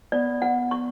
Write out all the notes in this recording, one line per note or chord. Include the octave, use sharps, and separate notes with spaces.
B3 D5
F#5
C#6